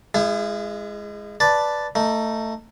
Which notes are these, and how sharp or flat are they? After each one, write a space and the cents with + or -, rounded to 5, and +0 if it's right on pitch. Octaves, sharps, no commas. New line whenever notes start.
G#3 +0 E4 +40 G#4 -40
B4 +0 D5 +0 A5 +0
A3 +20 D#4 +0